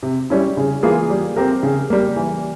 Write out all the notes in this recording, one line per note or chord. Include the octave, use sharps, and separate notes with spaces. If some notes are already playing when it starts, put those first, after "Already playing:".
C3
G3 C#4 E4
C#3
E3 A#3 F4 G#4
G3
C4 G4 A#4
C#3
G3 A#3
E3